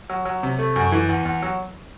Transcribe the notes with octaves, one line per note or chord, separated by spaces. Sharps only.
F#3
F#3
C3
A3
F#2
E3
E2
E2
F#3